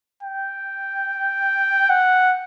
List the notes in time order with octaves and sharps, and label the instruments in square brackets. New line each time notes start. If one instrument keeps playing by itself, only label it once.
[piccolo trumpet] G5
F#5